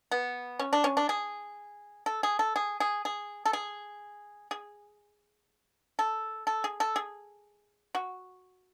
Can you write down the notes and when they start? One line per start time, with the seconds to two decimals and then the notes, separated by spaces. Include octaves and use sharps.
0.11 B3
0.59 C#4
0.73 D4
0.84 C#4
0.97 D4
1.09 G#4
2.06 A4
2.23 G#4
2.39 A4
2.56 G#4
2.80 G#4
3.05 G#4
3.45 A4
3.53 G#4
4.51 G#4
5.99 A4
6.47 A4
6.64 G#4
6.80 A4
6.96 G#4
7.95 F#4